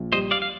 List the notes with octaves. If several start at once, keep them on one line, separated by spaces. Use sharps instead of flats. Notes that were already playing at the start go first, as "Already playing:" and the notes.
Already playing: A#1
G3 C5 D#5
D5 F5
F5